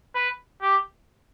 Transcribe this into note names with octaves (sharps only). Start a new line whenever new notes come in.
B4
G4